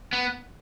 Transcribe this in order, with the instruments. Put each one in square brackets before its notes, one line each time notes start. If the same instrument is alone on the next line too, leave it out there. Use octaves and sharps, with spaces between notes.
[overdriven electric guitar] B3